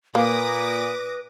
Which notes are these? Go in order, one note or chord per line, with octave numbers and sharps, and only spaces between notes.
A#2 A#3 B4 D6 D#6 A#6